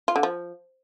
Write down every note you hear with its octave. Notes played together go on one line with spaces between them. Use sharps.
F4
D3
F3